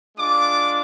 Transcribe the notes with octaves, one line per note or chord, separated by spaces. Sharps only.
G#3 D4 F4 D6